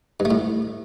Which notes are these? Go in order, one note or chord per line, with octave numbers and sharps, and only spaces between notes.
G2
A3
A2